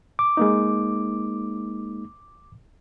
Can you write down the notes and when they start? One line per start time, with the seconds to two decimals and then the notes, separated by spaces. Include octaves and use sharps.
0.19 D6
0.37 G#3 A#3 D#4